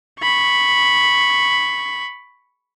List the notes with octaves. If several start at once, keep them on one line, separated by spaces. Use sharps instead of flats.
B5 C#6